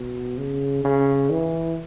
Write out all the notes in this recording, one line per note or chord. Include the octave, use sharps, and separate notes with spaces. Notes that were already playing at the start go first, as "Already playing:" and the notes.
Already playing: B2
C#3
C#3
E3